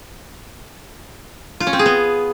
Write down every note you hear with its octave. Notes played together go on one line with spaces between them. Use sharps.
F4
C#4
C4
G#4
B3